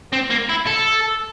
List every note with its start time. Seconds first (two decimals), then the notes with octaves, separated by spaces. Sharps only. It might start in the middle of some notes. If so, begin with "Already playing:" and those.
0.13 C4
0.30 A#3
0.49 E4
0.67 A4